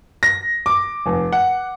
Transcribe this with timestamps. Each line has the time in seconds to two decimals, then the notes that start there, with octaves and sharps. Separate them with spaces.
0.23 A#6
0.66 D6
1.06 F1
1.32 F#5